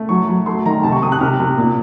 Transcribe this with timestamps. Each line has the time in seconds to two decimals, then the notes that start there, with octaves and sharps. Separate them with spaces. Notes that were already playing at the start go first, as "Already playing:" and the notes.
Already playing: A3
0.09 F#3 C#6
0.28 F#3
0.46 A3 C6
0.66 D#3 A#5
0.83 C3 A5
0.92 C#6
1.02 C3 D#6
1.12 F#6
1.21 C3 F6
1.40 C3
1.57 A#2